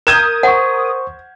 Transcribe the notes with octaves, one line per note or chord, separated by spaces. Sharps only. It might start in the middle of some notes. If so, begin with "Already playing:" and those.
A#4 D#6 G6 G#6 E7
C5 F#5 C#6